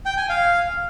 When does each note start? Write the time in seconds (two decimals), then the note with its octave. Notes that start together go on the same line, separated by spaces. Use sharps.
0.05 G5
0.17 G#5
0.29 F5